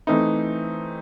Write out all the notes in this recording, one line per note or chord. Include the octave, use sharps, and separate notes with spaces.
E3 A3 C4 D#4